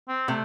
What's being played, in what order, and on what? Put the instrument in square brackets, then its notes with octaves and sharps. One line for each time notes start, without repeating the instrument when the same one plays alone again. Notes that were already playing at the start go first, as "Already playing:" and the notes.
[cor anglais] C4
[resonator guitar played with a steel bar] C3 [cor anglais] A3